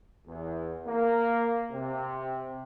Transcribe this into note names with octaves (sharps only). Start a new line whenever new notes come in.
E2
A#3
C3